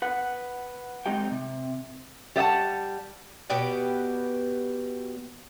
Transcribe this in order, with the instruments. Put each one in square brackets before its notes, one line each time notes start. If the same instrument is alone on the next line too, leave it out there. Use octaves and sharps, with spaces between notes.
[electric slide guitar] B4 F#5
G#3 C4 D#4 G4 G5
C3
[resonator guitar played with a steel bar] G3 D5 E5 F#5 A5
[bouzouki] B2 B3 G4 D5